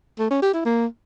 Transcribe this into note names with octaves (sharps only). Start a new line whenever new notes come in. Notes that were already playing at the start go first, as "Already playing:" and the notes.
A3
C#4
G4
E4
A#3